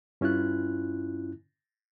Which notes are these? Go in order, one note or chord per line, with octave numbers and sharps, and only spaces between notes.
G2 C#4 E4 F4 F#6